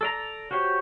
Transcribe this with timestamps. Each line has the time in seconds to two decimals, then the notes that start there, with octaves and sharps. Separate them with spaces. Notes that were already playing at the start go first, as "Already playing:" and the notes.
0.01 A4 D5 A#5
0.51 F#4 G4 C5 C#5